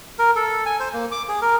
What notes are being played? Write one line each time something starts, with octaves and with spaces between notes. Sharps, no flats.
A#4
A4
G#5
C5
A#3
D6
G#4
A#4